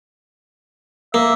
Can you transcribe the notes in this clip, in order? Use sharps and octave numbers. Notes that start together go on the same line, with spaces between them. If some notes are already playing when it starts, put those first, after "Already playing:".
A#3 E5